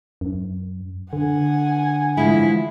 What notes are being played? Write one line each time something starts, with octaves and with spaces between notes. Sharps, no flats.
F#2
D3 F#5 G#5
E3 F3 G#3 E4